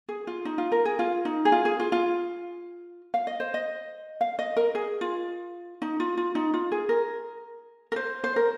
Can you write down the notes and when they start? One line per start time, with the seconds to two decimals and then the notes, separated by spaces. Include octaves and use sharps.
0.09 G#4
0.27 F4
0.45 D#4
0.58 F4
0.72 A#4
0.85 G#4
0.99 F4
1.25 D#4
1.45 G#4
1.52 F4
1.65 G#4
1.80 F4
1.92 F4
3.14 F5
3.27 D#5
3.40 C5
3.54 D#5
4.21 F5
4.39 D#5
4.57 A#4
4.75 G#4
5.01 F4
5.82 D#4
6.00 F4
6.17 F4
6.35 D#4
6.54 F4
6.72 G#4
6.89 A#4
7.92 A#4
7.96 C5
8.24 C5
8.36 A#4